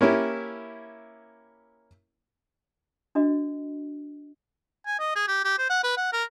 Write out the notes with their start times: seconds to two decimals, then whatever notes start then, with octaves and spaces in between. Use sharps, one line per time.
0.01 A#3 C#4 E4 G4
3.15 D4 F#4 D#5
4.86 G#5
4.99 D#5
5.16 G#4
5.28 G4
5.44 G4
5.58 C5
5.70 F#5
5.84 B4
5.97 F#5
6.13 A#4